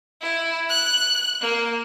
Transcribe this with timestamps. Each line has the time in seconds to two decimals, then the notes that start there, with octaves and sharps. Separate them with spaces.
0.21 E4
0.69 F#6
1.41 A#3